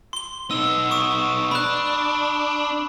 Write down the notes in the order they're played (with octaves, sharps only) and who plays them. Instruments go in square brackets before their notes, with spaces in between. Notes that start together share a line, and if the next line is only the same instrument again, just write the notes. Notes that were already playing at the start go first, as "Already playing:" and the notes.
[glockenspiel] C6 G7
[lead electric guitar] B2 D#4 [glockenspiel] E6
[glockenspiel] C#6 D#6
[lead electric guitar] D4 [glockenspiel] B5 F#6